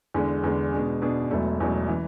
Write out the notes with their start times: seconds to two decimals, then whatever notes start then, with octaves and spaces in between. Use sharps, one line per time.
0.14 E2 D3 G#3
0.44 E2 D3 G#3
0.72 B2 G#3 D4 G#4
1.02 B2 G#3 D4 G#4
1.31 E1 E2 B2 F#3 A3
1.60 E1 E2 B2 F#3 A3
1.89 E3